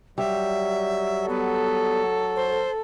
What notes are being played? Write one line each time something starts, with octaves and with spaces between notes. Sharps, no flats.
F#3 G3 E5
B3 A4
C5